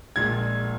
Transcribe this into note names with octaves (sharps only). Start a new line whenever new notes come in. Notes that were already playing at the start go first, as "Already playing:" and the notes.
A#1 A#2 G#3 G#6